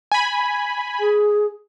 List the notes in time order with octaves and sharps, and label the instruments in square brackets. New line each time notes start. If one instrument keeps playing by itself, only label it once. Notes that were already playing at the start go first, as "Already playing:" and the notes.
[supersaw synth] G#5 B5
[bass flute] G#4